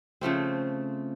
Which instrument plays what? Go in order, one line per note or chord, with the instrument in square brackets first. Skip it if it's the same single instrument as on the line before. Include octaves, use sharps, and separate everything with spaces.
[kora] C#3 F3 A3 C4